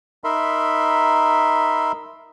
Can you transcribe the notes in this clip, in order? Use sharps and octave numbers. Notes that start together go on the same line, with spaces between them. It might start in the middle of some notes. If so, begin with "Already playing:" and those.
D#4 A#4 E5 B5 C6